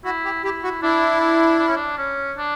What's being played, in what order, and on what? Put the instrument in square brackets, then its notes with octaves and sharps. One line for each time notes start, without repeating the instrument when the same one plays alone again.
[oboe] E4 [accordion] F#4
[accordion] G4
[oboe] E4 [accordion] G4
[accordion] F#4
[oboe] D4 [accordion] E4
[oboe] D4
D4
C#4
D4
C#4
D4